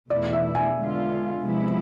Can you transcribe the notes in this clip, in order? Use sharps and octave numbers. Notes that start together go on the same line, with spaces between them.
E2 B2 A3 E4 D5
E5
G#5
D3 G#3 B3 F4
C3 F3 G#3 B3 E4